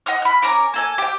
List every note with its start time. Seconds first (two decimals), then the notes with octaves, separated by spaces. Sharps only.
0.06 D#5 F#5 D#6 F6
0.22 B5 F6
0.42 C#4 A#4 A#5 D6
0.74 A#3 A4 G#5
0.98 G4 G5